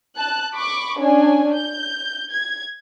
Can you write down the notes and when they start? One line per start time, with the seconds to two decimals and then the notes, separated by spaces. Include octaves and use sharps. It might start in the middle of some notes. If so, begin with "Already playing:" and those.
0.18 A5 F#6
0.54 B5 C#6 D6
0.99 C#4 D4 G#5
1.55 G6
2.33 G#6